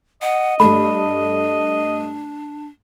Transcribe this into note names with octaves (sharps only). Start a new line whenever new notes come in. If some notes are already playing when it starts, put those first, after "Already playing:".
D#5 F#5
G2 A3 D4 B5